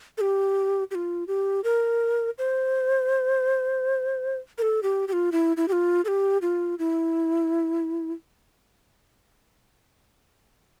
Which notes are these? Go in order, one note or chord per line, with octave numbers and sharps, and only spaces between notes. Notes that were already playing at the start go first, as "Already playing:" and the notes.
A4
G4
G4
F4
G4
A#4
C5
A#4
A4
G4
G4
F4
E4
E4
G4
F4
A4
G4
F4
E4